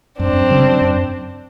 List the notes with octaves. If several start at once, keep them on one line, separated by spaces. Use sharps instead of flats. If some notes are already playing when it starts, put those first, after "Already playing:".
F#2 C4 D4
C#3 F#3
F#2